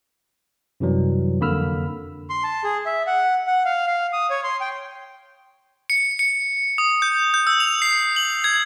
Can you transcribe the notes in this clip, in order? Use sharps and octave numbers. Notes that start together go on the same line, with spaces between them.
F#2 C3 E3 F#3 G3
F2 D3 A#3 B5 E6 F6
C6
A5
G#4
E5
F#5
F#5
F5
F5
D#6
C#5
C6
G5
C#7
C#7
D#6
G6
G6
E6
F7
C7
F#7
G#6